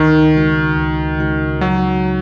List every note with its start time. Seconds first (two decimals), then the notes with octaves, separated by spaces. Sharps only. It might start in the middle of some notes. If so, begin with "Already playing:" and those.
Already playing: C#2 D#3
0.35 C#3 G#3 D#4 F#4
0.77 C#2
1.19 C#3 G#3 D#4 F#4
1.61 F#3